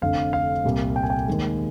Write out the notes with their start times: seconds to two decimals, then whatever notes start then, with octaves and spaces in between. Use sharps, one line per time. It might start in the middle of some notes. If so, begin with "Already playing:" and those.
0.02 F1 F2 D3 F5
0.33 F5
0.64 C2 A#2 G3 A#3
0.96 G5
1.03 G#5
1.10 G5
1.28 D#2 D#3 G#3